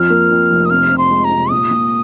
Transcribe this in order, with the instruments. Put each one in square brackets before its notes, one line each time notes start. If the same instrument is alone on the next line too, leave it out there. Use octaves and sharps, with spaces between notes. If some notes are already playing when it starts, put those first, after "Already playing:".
Already playing: [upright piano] F2 F3 [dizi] F6
[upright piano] A#3
F2
F1
[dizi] D#6
[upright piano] C3 [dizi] F6
[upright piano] C3
[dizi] C6
[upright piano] G#3
[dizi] A#5
[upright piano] C3
[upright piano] A#2 [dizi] D#6
[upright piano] A#2